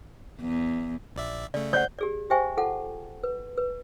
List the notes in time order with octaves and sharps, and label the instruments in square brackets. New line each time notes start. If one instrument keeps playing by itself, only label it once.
[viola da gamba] E2
[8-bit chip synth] A#1 D5 E5
[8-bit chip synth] C#3 A3 [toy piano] D5
[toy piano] C5 D5 F#5 [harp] G6
[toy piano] G4 G#4 D5
G4 C5 E5 G5 G#5 C#6
F4 A4 F#5 A5
B4
B4